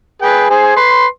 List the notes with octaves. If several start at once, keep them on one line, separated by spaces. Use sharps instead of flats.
G#4 B4 G5
G#4 C5 G#5
B4 C6